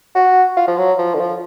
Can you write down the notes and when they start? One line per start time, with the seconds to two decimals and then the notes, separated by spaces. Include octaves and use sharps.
0.15 F#4
0.57 F4
0.67 F3
0.78 F#3
0.98 F3
1.14 D3
1.20 F3